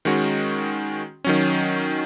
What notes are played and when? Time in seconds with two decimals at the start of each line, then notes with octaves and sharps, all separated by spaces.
0.05 D#3 G#3 C#4 F#4
1.24 D#3 F#3 C#4